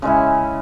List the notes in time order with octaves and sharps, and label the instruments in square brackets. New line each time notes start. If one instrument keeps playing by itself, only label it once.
[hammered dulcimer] C#3 G#3 C#4 E4